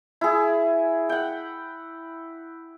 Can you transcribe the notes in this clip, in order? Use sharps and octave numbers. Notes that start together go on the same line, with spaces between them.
E4 G#4
F#5 G5